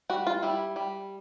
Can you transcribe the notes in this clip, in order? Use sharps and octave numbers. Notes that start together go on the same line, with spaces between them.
G3 F#4
F4
G3 E4
G3